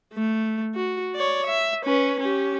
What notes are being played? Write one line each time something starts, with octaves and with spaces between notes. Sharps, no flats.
A3
F#4
C#5 D5
E5
C#4 B4
C#4 G4